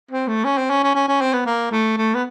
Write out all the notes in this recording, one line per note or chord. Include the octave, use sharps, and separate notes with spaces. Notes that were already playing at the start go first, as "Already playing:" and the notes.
C4
A3
C#4
C4
C#4
C#4
C#4
C#4
C4
B3
A#3
A3
A3
B3